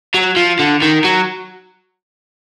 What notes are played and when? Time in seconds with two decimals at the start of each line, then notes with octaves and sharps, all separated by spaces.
0.15 F#3
0.37 F3
0.59 D3
0.82 D#3
1.05 F#3